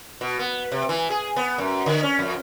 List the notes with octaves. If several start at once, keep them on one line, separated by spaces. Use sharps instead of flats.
B2
B3
C3
E3
G#4
B3
F#2
D3
C#4
F2